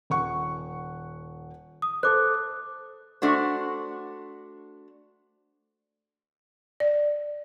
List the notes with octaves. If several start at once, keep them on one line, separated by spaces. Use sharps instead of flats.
D#1 F#5 C#6
D#6
A4 C5 D6 F#6
A3 D4 F#4 C5
D5